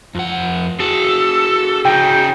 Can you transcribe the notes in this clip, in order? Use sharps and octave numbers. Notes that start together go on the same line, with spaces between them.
F2 F#5
F#4 G#4 A4
C#3 D#4 G5